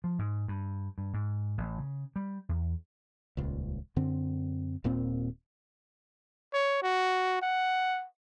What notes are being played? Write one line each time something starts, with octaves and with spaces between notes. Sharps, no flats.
F3
G#2
G2
G2
G#2
A1
C#3
G3
E2
D#1 C#2
F#2 D3 C4
D#1 A#2 A#3 C4
C#5
F#4
F#5